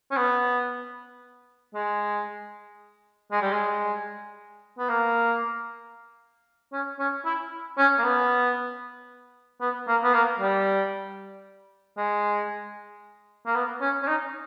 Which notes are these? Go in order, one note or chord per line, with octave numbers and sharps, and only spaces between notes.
C#4
B3
G#3
G#3
G3
G#3
B3
A#3
C#4
C#4
E4
C#4
A#3
B3
B3
A#3
B3
A#3
G3
G#3
A#3
B3
C#4
C#4
D#4